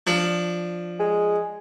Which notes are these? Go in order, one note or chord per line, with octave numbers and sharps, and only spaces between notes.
F3 D4
G#3